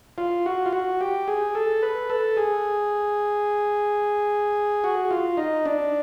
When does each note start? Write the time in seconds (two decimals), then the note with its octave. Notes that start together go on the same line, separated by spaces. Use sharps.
0.18 F4
0.46 F#4
0.66 F4
0.73 F#4
1.01 G4
1.28 G#4
1.55 A4
1.83 B4
2.10 A4
2.37 G#4
4.84 F#4
5.11 F4
5.37 D#4
5.66 D4